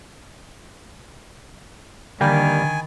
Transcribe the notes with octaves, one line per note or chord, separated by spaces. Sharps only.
D3 D#3 G3 A#3 G4 G#5 B5 A6